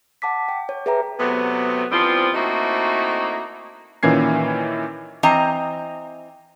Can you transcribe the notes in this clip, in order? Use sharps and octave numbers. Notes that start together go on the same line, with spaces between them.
F#5 A5 D6 B6
G5
C#5
G#4 B4 C#5 E5 G5 A#5
C3 F#3 A3 B3
E3 F3 G3 B3 C4 F4
A3 A#3 C4 D#4 E4 F#4
A#2 D#3 E3 C#4 G#6 C7
E3 C4 D#5 A#5